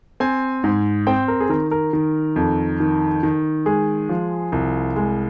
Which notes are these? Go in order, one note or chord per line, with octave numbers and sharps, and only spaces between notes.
C4 G#5
G#2
C4 G5
A#4
G#4
D#3 A#4
A#4
D#3
F2
D#3
D#3
G#3 G#4
F3
C2
G#3